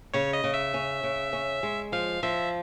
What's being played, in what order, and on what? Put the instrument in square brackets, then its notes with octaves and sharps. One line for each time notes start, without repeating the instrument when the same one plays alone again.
[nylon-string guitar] C#3 [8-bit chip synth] C#5
[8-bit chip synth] D#5
[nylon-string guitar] C#3
[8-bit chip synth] E5
[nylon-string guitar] C#4
C#3
C#4
G#3
[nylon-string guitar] F3 [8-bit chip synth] F5
[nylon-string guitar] F3 [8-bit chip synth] E5